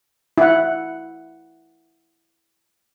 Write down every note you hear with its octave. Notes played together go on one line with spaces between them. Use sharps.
E4 F#5